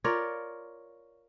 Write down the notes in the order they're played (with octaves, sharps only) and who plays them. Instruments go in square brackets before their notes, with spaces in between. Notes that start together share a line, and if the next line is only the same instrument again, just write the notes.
[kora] F4 A#4 C#5 D5